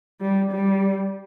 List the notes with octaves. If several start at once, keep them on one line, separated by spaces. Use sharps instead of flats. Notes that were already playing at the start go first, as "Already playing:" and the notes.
G3
G3